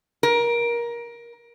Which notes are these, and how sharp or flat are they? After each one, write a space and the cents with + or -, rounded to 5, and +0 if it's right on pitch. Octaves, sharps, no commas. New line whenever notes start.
A#4 +20